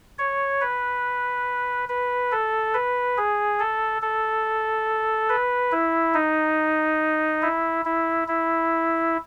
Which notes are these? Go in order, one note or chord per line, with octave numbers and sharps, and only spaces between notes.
C#5
B4
B4
A4
B4
G#4
A4
A4
B4
E4
D#4
E4
E4
E4